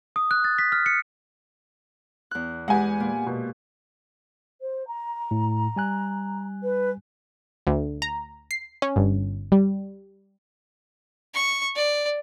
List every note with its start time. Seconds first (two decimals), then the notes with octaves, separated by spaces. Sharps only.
0.16 D#6
0.31 F#6
0.44 A6
0.59 B6
0.72 F6
0.86 C#7
2.31 E2 F#6
2.68 G#3 G4 B4 F#5 G#5
3.00 A#2
3.27 B2
4.61 C5
4.87 A#5
5.31 A2
5.76 G3 G#5 F#6
6.63 B4
7.67 D2
8.02 A#5
8.51 C7
8.82 C#4
8.96 G1
9.52 G3
11.34 C#6
11.76 D5